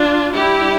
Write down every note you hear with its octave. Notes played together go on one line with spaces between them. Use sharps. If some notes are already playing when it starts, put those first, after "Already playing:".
Already playing: D4 F4
G3 D4 E4 G4